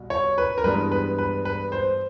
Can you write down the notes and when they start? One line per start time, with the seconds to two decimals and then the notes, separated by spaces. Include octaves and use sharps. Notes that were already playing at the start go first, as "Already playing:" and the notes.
Already playing: C2 B2
0.10 C#5
0.38 B4
0.58 A#4
0.64 G2 E3 G#3 B3 D4 B4
0.92 B4
1.18 B4
1.45 B4
1.72 C5